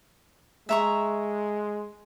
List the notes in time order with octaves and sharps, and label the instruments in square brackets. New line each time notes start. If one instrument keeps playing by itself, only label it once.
[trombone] G#3 [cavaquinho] E5 A#5 C#6